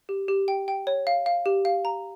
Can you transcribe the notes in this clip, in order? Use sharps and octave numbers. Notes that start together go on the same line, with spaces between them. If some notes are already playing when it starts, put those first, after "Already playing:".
G4
G4
G5
G5
C#5
F5
F5
G4
F5
A#5